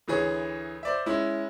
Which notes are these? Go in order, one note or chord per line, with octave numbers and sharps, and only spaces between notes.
D2 E3 G#4 C#5
C5 D5 E5
G#3 C#4 E4